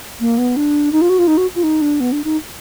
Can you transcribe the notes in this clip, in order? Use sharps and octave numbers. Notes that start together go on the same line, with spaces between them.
A#3
B3
D4
D#4
F4
F#4
F4
D#4
F#4
F4
D#4
D4
B3
D4
D#4